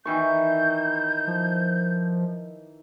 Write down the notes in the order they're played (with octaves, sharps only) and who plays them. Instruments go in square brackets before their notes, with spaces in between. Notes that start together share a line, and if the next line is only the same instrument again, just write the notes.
[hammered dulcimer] D#3 E3 C#6 [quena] G6
[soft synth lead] F3